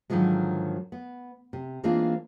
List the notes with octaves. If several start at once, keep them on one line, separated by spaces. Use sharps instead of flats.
G#2 D3 D#3 F3 F#3 G#3
B3
C3
E3 G#3 A#3 C4 D4 F4